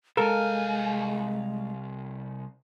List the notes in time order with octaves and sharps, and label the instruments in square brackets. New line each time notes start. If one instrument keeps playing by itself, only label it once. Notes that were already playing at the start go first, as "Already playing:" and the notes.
[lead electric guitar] C2 G#5 [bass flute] G#3 [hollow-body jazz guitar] A4 A#4 [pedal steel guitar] F5